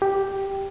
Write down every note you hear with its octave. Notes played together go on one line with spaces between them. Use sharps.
G4